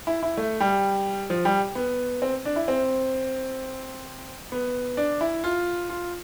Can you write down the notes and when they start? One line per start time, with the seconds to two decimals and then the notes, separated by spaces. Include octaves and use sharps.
0.07 E4
0.23 E4
0.37 A3
0.60 G3
1.30 F3
1.45 G3
1.75 B3
2.22 C4
2.45 D4
2.56 E4
2.68 C4
4.52 B3
4.97 D4
5.21 E4
5.44 F4
5.90 F4